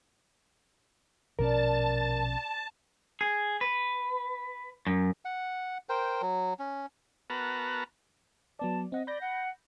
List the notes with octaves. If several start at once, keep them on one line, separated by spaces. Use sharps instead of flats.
A#1 B2 A#3 C#4 D4 A#4 A5
G#4
B4
F#2
F#5
A#4 C5 G5
F#3
C#4
B3 F#4 A#4 B4 A5 A#5
F#3 B3 D5 A5
C4 D#5 F#5
D5 B5 G6 A#6
F#5